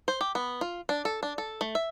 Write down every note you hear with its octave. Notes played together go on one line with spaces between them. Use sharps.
C5
G4
B3
F4
D4
A4
D4
A4
A3
E5